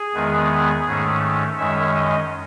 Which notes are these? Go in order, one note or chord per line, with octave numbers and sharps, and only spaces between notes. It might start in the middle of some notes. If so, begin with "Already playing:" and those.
Already playing: G#4
E2 D#3 G#3 B3
G#2 D#3 A3 C#4
F#2 D#3 G#3 C#4 E5
D#5